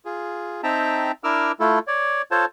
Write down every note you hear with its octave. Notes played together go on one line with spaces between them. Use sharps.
F4 G#4
C4 D#4 E5 G5 A5 A#5
D4 E4 A#4 D6 E6 F6
A3 E4 F4 A4
C#5 D5
F4 A4 C5 C#5 A5